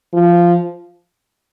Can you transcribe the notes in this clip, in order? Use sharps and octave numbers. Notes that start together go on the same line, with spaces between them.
F3